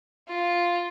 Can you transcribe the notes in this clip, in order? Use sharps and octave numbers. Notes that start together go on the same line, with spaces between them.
F4